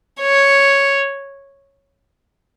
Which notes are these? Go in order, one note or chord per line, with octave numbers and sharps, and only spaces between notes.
C#5